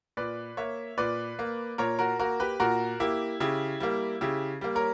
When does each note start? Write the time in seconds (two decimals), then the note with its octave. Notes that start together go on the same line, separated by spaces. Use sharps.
0.17 A#2 B4 D5
0.57 A#3 C#5 E5
0.98 A#2 B4 D5
1.39 A#3
1.78 A#2 A#4 C#5
1.99 F#4 A#4
2.19 A#3 F#4 A#4
2.40 G4 B4
2.60 A#2 F#4 A#4
3.00 A#3 E4 G4
3.40 C#3 E4 G4
3.80 G3 A#3
4.21 C#3 E4 G4
4.61 G3 A#3
4.75 A#4 C#5